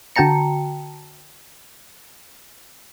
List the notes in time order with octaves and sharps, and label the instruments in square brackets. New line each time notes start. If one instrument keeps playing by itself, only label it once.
[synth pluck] D3 F#4 G5 A5 A#5 C#7